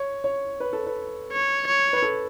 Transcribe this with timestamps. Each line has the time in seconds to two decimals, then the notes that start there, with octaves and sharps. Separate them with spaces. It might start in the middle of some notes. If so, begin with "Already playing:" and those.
Already playing: C#5
0.24 C#5
0.60 B4
0.73 A4
0.87 B4
1.32 C#5
1.67 C#5
1.93 B4
2.02 A4